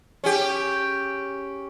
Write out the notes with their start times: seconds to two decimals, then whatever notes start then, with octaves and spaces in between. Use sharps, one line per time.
0.24 C#4 G4